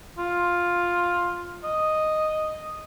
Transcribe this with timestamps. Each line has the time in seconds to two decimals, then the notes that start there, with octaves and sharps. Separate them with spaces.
0.18 F4
1.64 D#5